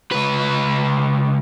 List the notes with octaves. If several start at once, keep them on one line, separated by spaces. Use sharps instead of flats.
C#2 B4